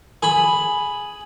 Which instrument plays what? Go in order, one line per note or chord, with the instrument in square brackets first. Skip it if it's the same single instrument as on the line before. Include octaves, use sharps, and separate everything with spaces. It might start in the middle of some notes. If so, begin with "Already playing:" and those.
[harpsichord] G#4 B5 [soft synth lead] G#5